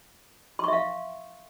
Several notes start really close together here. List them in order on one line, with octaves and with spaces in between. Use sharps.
C6 C#6 E5 F5